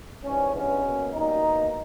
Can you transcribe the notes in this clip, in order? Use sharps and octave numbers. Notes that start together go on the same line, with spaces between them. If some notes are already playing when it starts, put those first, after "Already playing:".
G#2 E3 G3 C#4
G2 E3 G#3 B3 C#4
B2 A#3
B2 G3 A#3 D#4
B2 A#3